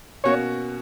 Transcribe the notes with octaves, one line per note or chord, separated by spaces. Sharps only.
B2 A#3 C#4 F#4 C#5